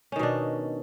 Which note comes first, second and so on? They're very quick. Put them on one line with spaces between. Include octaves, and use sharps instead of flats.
C#4 D#3 B2 D4